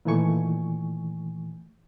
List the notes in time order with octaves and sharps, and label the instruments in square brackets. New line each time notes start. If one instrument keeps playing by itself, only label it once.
[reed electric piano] A#2 D#3 E3 A3 G#5 C#6